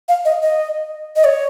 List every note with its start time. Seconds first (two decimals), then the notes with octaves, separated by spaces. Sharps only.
0.09 F5
0.25 D#5
0.43 D#5
1.16 D#5
1.24 C#5